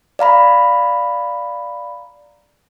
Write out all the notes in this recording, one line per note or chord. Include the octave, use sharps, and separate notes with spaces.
D5 F5 A#5 B5